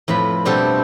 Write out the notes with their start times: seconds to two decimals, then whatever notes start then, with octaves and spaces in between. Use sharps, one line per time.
0.08 F2 A2 F4 B4 B5
0.45 B2 G3 A3 C4 D4 A4